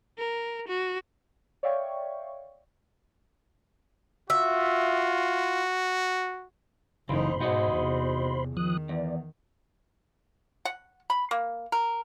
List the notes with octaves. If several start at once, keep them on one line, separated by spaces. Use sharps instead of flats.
A#4
F#4
C#5 D5 E5 F5 G5 C#6
F4 F#4 E5
F#1 C#3 E3 D#4 C5 B5 C6
G#2 B2 D#4 F#4 D#5
E2 C3
D#3 F3 D#6 F#6
E2 D5
F#5
B5
A#3
A#4